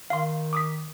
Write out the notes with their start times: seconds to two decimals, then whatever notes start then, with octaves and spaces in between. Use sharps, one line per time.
0.10 D#3 F5 C6
0.53 D6 D#6 B6